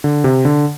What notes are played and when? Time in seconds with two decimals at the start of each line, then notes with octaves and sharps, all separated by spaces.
0.04 D3
0.24 C3
0.45 D3